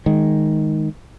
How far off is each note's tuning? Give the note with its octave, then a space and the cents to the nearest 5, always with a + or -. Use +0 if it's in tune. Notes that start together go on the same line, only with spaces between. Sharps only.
D#3 +0 G#3 +0